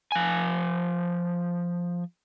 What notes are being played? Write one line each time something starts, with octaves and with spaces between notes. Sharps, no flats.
F3 G#5